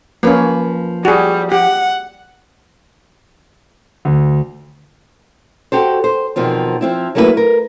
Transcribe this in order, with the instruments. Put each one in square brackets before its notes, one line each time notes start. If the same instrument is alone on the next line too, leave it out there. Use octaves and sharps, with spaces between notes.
[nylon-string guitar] F3 B4 [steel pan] A#3 C#4
[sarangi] G3 [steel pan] F#4 G#4
[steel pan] G4 [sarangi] F#5
[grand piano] D2
[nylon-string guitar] F#4 G4 A4 C5
C5
E2 B2 D#3 F3 C4
F3 C4 E4
F#3 A3 A#3 E4 A4 B4
A#4